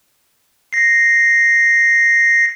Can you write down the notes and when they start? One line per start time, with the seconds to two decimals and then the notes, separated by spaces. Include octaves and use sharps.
0.73 A#6 C7